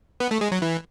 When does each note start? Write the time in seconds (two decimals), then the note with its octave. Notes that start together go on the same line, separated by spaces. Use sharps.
0.20 B3
0.31 A3
0.41 G#3
0.52 F#3
0.62 E3